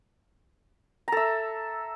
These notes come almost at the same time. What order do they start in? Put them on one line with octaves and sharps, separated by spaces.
A#5 A4 E5